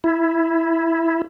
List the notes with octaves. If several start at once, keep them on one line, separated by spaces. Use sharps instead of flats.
E4